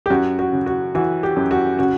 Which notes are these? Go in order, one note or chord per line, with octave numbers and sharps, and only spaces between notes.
G4
F#2 F#4
F#4
C#3
F#4
E3 F#4
G4
F#2
F#4
C#3 F#4